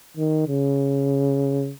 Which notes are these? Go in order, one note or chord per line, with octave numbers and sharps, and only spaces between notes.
D#3
C#3